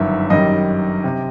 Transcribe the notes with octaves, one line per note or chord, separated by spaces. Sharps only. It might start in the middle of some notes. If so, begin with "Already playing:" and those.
Already playing: G1 F#2 D#3 E5
F#2 D#3 G3 D#5
C3